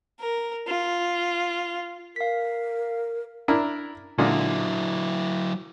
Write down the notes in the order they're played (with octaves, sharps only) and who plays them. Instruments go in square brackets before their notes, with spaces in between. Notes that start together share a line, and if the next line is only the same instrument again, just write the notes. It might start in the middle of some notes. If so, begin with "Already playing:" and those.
[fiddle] A#4
F4
[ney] A#4 [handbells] F5 B6
[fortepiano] D4 E4 A#4
[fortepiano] A#2 D3 G#3 [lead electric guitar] F#3 E4